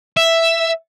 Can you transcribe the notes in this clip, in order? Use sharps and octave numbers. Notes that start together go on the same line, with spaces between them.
E5